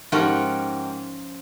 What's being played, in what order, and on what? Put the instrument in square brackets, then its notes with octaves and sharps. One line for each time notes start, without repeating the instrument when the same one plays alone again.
[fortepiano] G#2 A#4 [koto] F3 C#4 [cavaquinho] D#4 G4 F#5